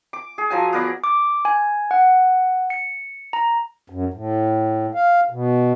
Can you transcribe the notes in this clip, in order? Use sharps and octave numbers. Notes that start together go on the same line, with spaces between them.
D6
G#4
F3 F#3 G#5
B3 A#4 D5 C#6
D6
G#5
F#5
C#7
A#5
F#2
A2
F5
B2